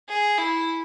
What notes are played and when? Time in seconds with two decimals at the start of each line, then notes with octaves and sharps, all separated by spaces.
0.09 G#4
0.38 E4